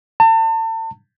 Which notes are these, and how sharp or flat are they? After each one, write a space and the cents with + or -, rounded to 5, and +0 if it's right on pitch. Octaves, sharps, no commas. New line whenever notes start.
A5 +35